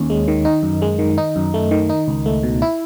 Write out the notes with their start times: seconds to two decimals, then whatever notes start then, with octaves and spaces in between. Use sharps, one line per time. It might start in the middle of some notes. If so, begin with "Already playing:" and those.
Already playing: D#2 C#4
0.10 G#3
0.28 D#3
0.45 D#4
0.63 F#2
0.82 G#3
0.99 D#3
1.18 D#4
1.36 F#2
1.54 A3
1.71 D#3
1.89 D#4
2.08 C#2
2.26 A3
2.43 B2
2.62 E4